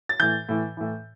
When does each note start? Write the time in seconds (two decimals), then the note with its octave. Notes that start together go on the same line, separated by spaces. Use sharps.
0.09 A6
0.20 A2 E3 G6
0.49 A2 E3
0.77 A2 E3